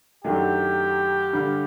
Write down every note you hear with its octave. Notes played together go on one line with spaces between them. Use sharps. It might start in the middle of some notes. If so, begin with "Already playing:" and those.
F#2 D#3 F#3 A3 D4 G4
G2 D3 G3